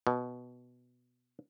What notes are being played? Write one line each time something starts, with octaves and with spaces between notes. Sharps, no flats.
B2